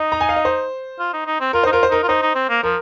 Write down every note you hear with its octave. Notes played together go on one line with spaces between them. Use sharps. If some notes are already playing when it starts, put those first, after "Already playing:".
Already playing: D#4 D#5
A#5
G#5
F5
D#5
C5
F4
D#4
D#4
C4
F4 A#4
D#4 C5
F4 A#4
C5
D#4 A#4
F4
D#4 C5
D#4
C4
A#3
F3 A#4